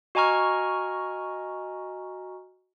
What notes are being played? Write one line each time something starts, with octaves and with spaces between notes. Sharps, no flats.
F#4 D#5 G#5 A#5 C#6 F6